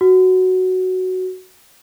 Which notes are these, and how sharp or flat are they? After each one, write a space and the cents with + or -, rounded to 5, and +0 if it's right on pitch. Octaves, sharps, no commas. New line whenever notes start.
F#4 +5